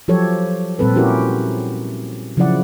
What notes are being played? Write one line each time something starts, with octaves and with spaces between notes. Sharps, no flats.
F3 F#3 G4 A4 C#5
A#2 G3 C4 A4 B4
C#4 E4 F#4 G4 A#4
C#3 F3 F#3 E4 D5 F#5